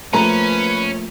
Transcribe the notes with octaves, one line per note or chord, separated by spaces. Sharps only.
F3 A3 A#3 C#4 B4 A#5